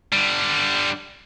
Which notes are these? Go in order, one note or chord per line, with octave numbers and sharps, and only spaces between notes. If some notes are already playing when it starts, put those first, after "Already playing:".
D3 G3